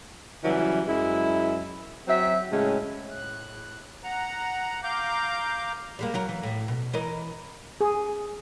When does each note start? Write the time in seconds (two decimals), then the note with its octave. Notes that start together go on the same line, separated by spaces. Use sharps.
0.44 C#3 E3 F#3 G3
0.88 F#2 G#3 E4
2.08 F#3 C4 E5
2.51 A2 C#3 G#3 C#4
3.11 A2 F#6
4.04 F#5 A#5
4.84 F5 A#5 D6 G6
5.99 G3 G#3 A#3
6.14 F#3 F#4 A#4
6.29 E3
6.43 A2
6.68 B2
6.93 E3 A#4 D#5
7.81 G#4